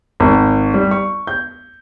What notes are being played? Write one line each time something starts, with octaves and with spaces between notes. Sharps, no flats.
G#1
G3
C#6
G6